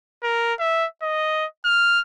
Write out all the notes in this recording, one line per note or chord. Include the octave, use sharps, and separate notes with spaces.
A#4
E5
D#5
F6